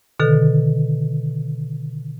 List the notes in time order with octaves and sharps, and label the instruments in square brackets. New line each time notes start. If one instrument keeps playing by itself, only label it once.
[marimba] B2 D3 D#3 A4